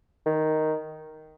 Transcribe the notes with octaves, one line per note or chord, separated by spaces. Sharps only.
D#3